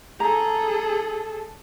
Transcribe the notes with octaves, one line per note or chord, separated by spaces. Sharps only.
G#4 A4 A#5